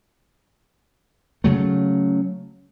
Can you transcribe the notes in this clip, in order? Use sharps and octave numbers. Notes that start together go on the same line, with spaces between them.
C#3 F#3 A3